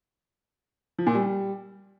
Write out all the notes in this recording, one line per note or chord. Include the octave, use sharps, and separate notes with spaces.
F3
A#2
G3